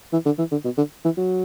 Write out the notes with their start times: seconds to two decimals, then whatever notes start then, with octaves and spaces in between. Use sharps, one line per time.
0.13 E3
0.26 D3
0.38 E3
0.52 D3
0.65 B2
0.77 D3
1.04 E3
1.17 F#3